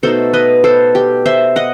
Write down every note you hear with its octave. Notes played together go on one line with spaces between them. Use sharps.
B2 A3 D#4 A4 C5
B4 D#5
A4 C5
G4
C5 E5
D#5 F#5